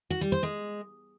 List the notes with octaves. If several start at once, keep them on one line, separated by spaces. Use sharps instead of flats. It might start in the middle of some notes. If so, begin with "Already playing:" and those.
F#4
G3
C5
G#3